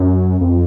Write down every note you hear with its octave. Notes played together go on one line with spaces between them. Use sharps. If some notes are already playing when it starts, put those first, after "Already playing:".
Already playing: F#2
F2